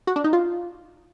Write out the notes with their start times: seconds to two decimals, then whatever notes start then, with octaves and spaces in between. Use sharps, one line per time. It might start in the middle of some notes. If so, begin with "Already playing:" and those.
0.07 F#4
0.16 D4
0.24 D#4
0.33 F4